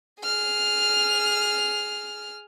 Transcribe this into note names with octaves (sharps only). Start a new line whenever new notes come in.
G#4 F6